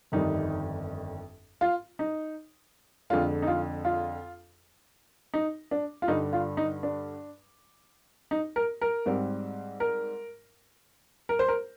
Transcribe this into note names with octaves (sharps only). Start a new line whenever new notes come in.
G1 F2 D#3 G3 D#4
F4
D#4
F2 D3 G#3 D4 F4
D#4
F4
F4
D#4
D4
F4
G2 D3 G3 D4 D#4
F4
D#4
D4
D#4
A#4
A#4
G#2 G3 C4
A#4
A#4
C5
A#4